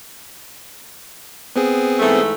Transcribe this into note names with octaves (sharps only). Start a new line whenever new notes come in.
B3 C4 G#4
G#2 E3 A3